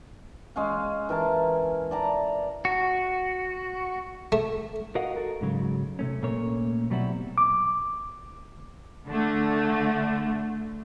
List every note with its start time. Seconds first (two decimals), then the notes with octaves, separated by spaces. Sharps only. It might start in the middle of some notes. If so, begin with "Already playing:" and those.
0.56 G#3 C#4 F5
1.09 E3 A#4 G#5 A5
1.91 D5 A5 A#5
2.65 F#4
4.32 A3
4.95 F#4 A#4 D#5 F5 F#5
5.16 F#4 A4 A#4
5.41 G#2 C#3 F#3
5.99 C3 A3 C#4
6.23 A#2 A3 A#3 C#4 C#5
6.90 B2 F#3 G3 C4 E4 F#4
7.38 D6
9.07 D3 A3